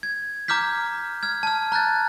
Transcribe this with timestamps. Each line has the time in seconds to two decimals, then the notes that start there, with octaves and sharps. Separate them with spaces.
0.03 G#6
0.48 A#5 D6 F6 G6 B6
1.23 F6 G#6
1.43 A5 F6
1.72 A#5 F#6 G6 A6